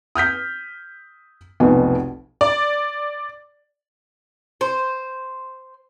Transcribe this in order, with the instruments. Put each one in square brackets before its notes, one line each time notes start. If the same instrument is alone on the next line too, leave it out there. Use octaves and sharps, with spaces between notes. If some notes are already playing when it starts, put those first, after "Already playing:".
[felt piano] D#6 F6 G6 B6
F1 B1 F2 B2 G#5
[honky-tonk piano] D5
[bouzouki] C5